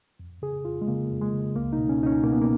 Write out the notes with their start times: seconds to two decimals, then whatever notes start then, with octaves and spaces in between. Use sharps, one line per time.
0.20 F2
0.42 C#3 G#4
0.65 F2 F4
0.81 G#3
0.88 C#3 A#3
1.11 F2
1.21 G#3
1.33 C#3
1.55 C#2 A#3
1.73 D#4
1.78 B2
1.89 C#4
2.01 C#2 D#4
2.06 C#4
2.24 B2 A#3
2.32 B3
2.41 A#3